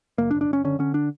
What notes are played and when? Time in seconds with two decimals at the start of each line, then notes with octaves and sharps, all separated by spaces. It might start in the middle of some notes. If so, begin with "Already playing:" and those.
0.18 F#1 A#3
0.31 D4
0.35 F#1
0.41 D4
0.49 F#1 C#4
0.64 D3 C#4
0.79 D3 C#4
0.94 D4